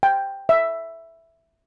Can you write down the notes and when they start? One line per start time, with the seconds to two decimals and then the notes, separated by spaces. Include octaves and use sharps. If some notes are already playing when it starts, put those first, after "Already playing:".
0.03 G5
0.49 E5